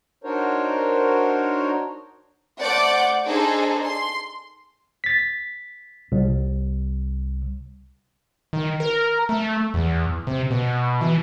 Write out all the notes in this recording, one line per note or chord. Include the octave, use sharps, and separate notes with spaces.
D4 D#4 F#4 A#4 C5 C#5
A3 C5 D5 F#5 D6 G6
D4 D#4 G#4 A4 C5
C6
A6 B6
C2
D#3
A#4
A3
E2
C3
B2
E3